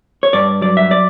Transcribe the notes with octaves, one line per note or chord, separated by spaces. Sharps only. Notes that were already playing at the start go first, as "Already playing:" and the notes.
C#5
G2 D5
F#3 D5
E5
D5